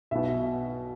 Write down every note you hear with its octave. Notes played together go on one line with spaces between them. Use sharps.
B1 B2 E5